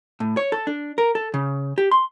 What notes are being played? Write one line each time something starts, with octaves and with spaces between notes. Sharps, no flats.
A2
C#5
A4
D4
A#4
A4
C#3
G4
C6